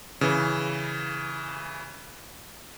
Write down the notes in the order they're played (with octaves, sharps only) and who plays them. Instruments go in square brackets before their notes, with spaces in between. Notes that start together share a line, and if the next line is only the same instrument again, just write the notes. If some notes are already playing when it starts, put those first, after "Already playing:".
[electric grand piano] C#3 E3